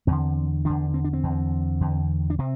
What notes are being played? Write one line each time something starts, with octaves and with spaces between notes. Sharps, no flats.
E2 D3 C4
E2 D3 D4
C4
D4
C4
E2 D3
E2 D3
D4
C3 C4